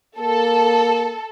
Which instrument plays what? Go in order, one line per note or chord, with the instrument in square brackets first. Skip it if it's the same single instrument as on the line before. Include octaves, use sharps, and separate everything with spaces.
[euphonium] A#3 [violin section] A4